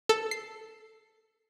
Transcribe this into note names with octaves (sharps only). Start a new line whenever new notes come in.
A4
C7